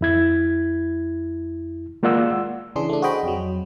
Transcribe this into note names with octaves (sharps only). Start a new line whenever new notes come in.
F2 E4 G#6
G#3 A#3 F4 D5 F#5 E6
C#3 E3 D4 G#4 C6
A3 D4
F#4 G#4 C5 D#5 G5 B5
F2 F#3